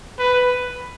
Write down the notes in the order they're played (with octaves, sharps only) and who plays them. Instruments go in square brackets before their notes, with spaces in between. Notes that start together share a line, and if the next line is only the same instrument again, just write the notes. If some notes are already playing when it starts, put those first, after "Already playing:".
[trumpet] B4